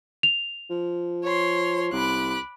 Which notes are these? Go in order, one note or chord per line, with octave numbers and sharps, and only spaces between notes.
F7
F3
C#5 C6
C2 B5 D6 F#6